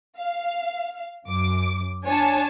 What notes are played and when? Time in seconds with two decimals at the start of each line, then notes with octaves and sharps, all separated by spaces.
0.18 F5
1.26 F#2 D6
2.05 D4 C#5 G#5 A5